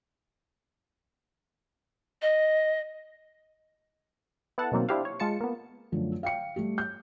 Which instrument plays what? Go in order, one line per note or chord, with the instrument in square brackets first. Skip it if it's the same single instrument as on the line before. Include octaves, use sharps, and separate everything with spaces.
[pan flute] D#5
[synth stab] B3 E4 A4 F#5 A5
B2 D#3 F#3 A#3 C4
D4 E4 F4 G4 C5 F5
C#5
G#3 F4 A5 C#7
A#3 B3
[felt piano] F#2 D3 F3 A3
F5 G5 C#7
G3 A3 G4
G6